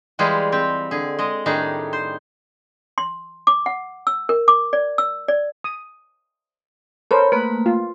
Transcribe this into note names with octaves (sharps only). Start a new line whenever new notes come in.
E3 G3 G#3 F4 G4 G#4
C4 G4
D3 G#4
G#3 D#5
A2 D#3 G3 D4 D#4 G#4
C5
C6
D6
F#5
E6
A#4
D6
D5
E6
D5
D#6
A4 A#4 C5 C#5 B5
A3 A#3 B4
F4